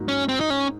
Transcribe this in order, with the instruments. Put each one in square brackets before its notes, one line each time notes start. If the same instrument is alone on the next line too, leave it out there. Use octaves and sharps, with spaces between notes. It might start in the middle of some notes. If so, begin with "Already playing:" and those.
Already playing: [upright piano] G#2 F#3 A#3 D#4
[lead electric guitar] C#4
C4
D#4
C#4